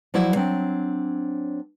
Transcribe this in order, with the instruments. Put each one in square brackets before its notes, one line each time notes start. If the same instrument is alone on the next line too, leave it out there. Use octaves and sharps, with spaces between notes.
[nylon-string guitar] F3 F#3 E4 D5
F#3 C4 D4